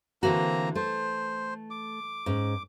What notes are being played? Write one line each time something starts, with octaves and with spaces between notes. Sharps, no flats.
D3 E3 A#3 C4 F#4 A#5
A3 C5
D6
G#2 C#4